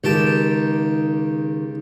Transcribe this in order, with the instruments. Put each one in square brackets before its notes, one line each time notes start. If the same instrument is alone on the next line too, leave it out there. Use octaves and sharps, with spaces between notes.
[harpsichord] C#2 G4 A5 [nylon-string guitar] D#3